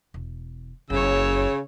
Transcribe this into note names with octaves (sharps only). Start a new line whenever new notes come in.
E1
F#1 F#2 C#3 C#5 E6